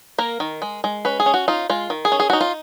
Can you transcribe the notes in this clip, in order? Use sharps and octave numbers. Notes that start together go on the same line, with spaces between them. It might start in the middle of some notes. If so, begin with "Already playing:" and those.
A#3 A#4
D#3
G#3
G#3
C#4 B4
G#4
C#4
F#4
D#4 F4
G#3 F4
D#3
G#4
C#4
G#4
D#4 F#4
F4